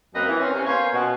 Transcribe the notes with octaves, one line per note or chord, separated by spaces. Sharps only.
F#2 A#3 C4 B4 D#5
E3
C4 C#4
C3 C#4
A#3 B3 C#4 C5 C#5
B2